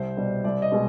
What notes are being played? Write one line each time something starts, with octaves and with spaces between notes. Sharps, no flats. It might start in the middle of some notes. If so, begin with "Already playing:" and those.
Already playing: C2 C5
B2 G3
C2 D5
D#5
B2 G#3